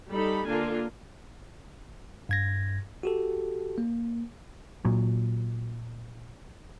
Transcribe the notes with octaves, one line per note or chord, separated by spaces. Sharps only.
G3 D#4 A4 B5
D3 A#3 D4 F4 G#5
G2 G#6 A#6
F#4 G4 A4
A#3
A#2 F#3